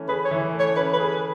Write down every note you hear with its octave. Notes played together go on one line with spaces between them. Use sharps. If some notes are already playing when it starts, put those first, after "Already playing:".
Already playing: E3 A3 C#4
G#4 B4
C#5
E3
A3
C#5
C#4 B4
B4
G#4
B4